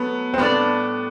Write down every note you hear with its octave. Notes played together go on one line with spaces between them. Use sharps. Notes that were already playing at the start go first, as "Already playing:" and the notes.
Already playing: F#3 A3 B3 A4
C4
A2 G3 B3 D4 A4 D5